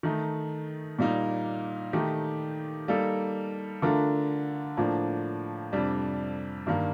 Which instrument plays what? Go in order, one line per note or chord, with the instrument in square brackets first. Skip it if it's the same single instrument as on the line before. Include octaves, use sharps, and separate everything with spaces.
[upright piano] D#3 A3 D#4
A#2 G3 A#3 D#4
D#3 A3 D#4 G4
G3 A#3 D#4 A4
D3 A3 D4 F4 A#4
A2 F3 A#3 D4
F2 C3 G3 D4
G2 D#3 A#3